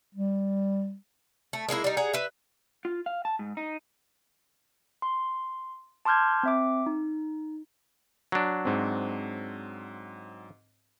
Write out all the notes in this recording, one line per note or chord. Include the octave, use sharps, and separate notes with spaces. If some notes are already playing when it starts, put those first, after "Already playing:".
G3
A3
G#3 A#3 D#4 E4
G3 D#4
G#4 F#5 A#5
B4 E5
F4
F5
A5
G#2
D#4
C6
A5 C6 D6 F6 G6 G#6
C4 E5 D6
D#4
F#3 D4
G#2 C4